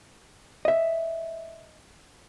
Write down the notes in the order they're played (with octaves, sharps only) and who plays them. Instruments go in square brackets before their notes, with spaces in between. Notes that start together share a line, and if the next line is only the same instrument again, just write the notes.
[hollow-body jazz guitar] D#5 E5